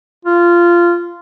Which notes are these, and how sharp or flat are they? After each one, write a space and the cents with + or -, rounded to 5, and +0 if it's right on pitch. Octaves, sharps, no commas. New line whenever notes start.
F4 -15